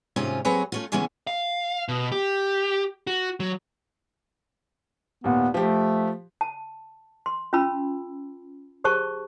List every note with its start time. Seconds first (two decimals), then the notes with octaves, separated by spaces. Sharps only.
0.16 D#2 G#2 C3 C#4 F4 C5
0.45 F#3 A#3 C4 G#4 B4 C#5
0.72 A3 C#4 F4
0.92 C#3 E3 G#3 A#3 B3 C#4
1.27 F5
1.88 B2
2.12 G4
3.07 F#4
3.40 F#3
5.24 D#2 A#2 B3
5.54 F3 A3 G4
6.41 A5
7.26 C6
7.53 C#4 F4 A5 B5 E6
8.84 G4 G#4 C5 A5 C#6